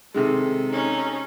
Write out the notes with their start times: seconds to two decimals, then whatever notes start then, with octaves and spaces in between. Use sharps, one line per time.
0.14 C3 D#3 G#3 A4
0.71 C#4 D#4